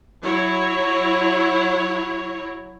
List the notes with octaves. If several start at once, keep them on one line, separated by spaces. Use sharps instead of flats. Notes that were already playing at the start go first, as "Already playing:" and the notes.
F#3 E4 C#5